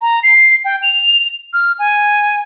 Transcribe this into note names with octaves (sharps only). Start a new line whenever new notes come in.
A#5
C7
G5
F7
F6
G#5